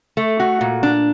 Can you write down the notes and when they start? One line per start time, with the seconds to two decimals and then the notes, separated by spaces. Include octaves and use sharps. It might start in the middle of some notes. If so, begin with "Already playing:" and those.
0.17 A3
0.40 F#4
0.61 A#2
0.83 D4